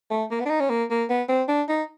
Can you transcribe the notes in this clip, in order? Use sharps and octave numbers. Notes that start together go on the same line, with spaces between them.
A3
A#3
B3
D4
D#4
C#4
A#3
A#3
B3
C4
D4
D#4